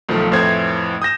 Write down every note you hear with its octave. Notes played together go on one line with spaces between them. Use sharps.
B1 D#3 F3 A3
F2 A2 E3 C5 G#6
D#6 G6 A#6 E7